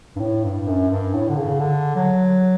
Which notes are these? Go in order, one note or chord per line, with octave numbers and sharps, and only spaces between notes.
G2
A2
G2
F#2
G2
A2
D3
C#3
D3
F#3